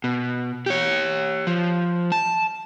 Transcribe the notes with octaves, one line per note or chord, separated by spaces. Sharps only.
B2
G4 C#5
F3
A5